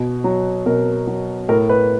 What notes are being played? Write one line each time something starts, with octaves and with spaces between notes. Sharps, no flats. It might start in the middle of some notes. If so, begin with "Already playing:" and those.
Already playing: B2
F#3
B2 A#4
F#3
A2 A#4
B4